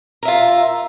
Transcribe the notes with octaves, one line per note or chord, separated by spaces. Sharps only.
F4 A#4 E5